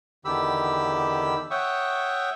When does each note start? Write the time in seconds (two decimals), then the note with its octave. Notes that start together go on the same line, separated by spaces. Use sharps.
0.25 E2 D3 D#3 G4 B5 E6
1.51 C#5 E5 F#5 G5 C#6 D#6